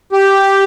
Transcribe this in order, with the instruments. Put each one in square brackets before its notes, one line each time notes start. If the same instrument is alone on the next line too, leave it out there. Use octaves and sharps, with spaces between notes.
[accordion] G4